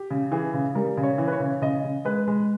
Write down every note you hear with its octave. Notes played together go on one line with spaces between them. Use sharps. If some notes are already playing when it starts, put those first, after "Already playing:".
Already playing: G4
C#3
E3 G#4
C#3
G3 A#4
C#3
C#5
E3
B4
C#5
C#3
C#3 D#5
C#3
G#3 B4
G#3